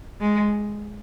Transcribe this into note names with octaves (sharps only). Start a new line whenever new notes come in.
G#3